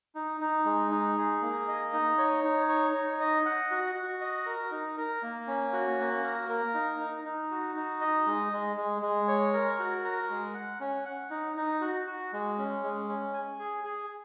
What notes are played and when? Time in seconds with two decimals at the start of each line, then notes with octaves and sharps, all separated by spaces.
0.15 D#4
0.41 D#4
0.66 G#3
0.91 D#4
1.18 G#4
1.42 A#3
1.68 D#5
1.93 D#4
2.18 C#5
2.44 D#4
2.69 C#5
2.94 D#4
3.20 D#5
3.46 F#5
3.71 F#4
3.95 F#4
4.21 D#5
4.46 A#4
4.71 D#4
4.98 A#4
5.23 A#3
5.47 C#4
5.73 F#4
5.99 A#3
6.23 A#4
6.50 A#4
6.74 D#4
7.00 D#4
7.25 D#4
7.51 F#4
7.76 D#4
8.01 D#5
8.26 G#3
8.52 G#3
8.77 G#3
9.02 G#3
9.28 C#5
9.53 A#4
9.79 F#4
10.04 A#4
10.30 G#3
10.54 F#5
10.80 C#4
11.05 F#5
11.30 D#4
11.57 D#4
11.81 F#4
12.07 F#4
12.33 G#3
12.58 C#4
12.83 G#3
13.09 C#4
13.34 G#5
13.59 G#4
13.84 G#4